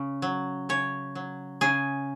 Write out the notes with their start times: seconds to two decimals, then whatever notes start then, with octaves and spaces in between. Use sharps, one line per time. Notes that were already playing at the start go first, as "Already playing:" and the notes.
Already playing: C#3
0.22 F#3
0.69 C#3 C#5
1.15 F#3
1.61 C#3 G#4